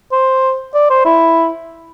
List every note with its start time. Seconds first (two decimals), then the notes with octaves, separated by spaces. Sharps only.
0.12 C5
0.74 D5
0.90 C5
1.05 E4